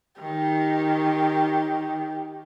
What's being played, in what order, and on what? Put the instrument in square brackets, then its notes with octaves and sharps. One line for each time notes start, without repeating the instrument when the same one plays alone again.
[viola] D#3 [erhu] G4